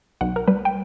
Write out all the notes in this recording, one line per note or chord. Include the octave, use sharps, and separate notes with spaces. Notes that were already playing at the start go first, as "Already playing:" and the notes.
B1 F#5
A#4
G3 B4
G5